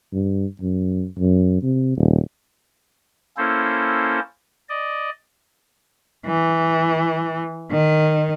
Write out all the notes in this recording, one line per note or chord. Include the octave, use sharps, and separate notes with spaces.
G2
F#2
F#2
C3
D#1
A#3 C#4 E4 A4 C5
D5 D#5
E3
D#3